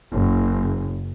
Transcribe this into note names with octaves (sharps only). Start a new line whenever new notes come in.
F#1